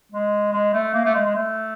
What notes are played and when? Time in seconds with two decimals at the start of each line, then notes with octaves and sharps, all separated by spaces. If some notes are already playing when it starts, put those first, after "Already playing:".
0.12 G#3
0.53 G#3
0.74 A3
0.94 A#3
1.05 A3
1.15 G#3
1.25 G#3
1.35 A3